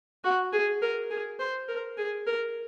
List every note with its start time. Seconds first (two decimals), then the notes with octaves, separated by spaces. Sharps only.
0.24 F#4
0.53 G#4
0.82 A#4
1.10 G#4
1.40 C5
1.69 A#4
1.97 G#4
2.27 A#4